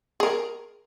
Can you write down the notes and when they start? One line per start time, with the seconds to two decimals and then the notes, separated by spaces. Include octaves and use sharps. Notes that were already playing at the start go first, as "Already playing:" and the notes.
0.20 G#4 A#4